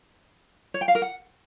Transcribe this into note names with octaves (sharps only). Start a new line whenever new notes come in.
C#5
G5
F5
A#4
F#5